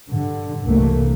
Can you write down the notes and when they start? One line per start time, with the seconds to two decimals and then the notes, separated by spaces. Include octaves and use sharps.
0.12 G2 D3
0.64 C2 G2 E3 A3 A#3